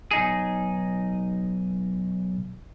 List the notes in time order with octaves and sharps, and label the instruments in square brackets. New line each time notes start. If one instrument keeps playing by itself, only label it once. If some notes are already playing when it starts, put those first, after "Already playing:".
[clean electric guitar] B1 D#4 G#4